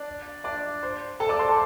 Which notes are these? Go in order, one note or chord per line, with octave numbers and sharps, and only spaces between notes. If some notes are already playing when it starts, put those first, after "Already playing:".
Already playing: D4 D5
D4 D5
C5
A4 A5
D5 D6
C5 C6
A4 A5